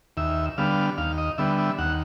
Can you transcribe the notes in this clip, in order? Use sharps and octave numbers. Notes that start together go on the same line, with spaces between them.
D#2 E5
D3 G3 B3 F5
D#2 F5
D#5
D3 G3 B3 E5
E5
D#2 F#5